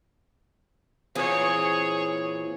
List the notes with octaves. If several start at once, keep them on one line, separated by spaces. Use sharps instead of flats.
A#2 E3 C4 G#4 C#5